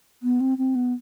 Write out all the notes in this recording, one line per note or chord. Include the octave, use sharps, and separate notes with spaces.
B3
C4
C4
B3